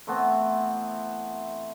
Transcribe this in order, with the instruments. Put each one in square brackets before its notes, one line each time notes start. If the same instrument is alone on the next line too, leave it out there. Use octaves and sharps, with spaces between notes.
[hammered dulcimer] E3 A3 B3 C4